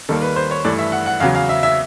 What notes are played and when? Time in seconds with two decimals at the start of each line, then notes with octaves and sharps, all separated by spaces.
0.09 D#2 D#3 G3 A#3 A4
0.22 B4
0.36 C5
0.51 C#5
0.64 G2 E3 A3 D5
0.79 E5
0.92 F#5
1.06 F#5
1.20 E2 C#3 F#3 F5
1.35 F5
1.49 E5
1.63 E5